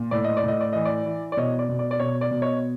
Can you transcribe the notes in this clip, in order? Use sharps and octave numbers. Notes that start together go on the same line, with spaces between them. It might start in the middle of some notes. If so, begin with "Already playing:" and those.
Already playing: A#2
A2 D5
D#5
D5
A2 D#5
D5
E3 D#5
D5
E3
D5
B2 C#5 D#5
D5
B2
D5
D5
B2 C#5
D5
B2
C#5 D#5